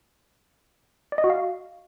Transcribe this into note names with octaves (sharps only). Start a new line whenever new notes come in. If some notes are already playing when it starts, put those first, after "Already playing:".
D5
D#5
F#4
F5